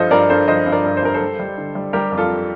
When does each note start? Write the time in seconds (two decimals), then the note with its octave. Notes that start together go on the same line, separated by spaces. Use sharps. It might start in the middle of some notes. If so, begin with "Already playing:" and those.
Already playing: G2 F3 F4 A4 C5 D#5
0.11 G2 A#4 D5
0.29 G2 A4 C5
0.48 F3 C5 D#5
0.66 G2
0.72 A#4 D5
0.84 G2
0.97 C5
1.03 G2 A#4
1.14 A4 C5
1.21 G3
1.39 G3
1.58 D3
1.75 G3
1.93 G3 G4 A#4
2.12 F2
2.17 F4 A4